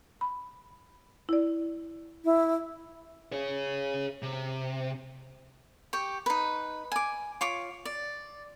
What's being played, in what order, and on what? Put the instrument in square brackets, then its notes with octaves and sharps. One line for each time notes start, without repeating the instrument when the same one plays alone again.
[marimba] B5
E4 D5
[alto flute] E4
[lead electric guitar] G#4 C#5
C3
[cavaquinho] G4 G5 C#6
D#4 B4
G#5 D6
F4 C#5 D6
D5